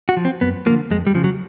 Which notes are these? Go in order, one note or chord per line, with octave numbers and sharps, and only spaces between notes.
F#4
F3
C4
F#2 B3
D3 F3 A#3
F2 G#3
G3
C#3 F3
F#3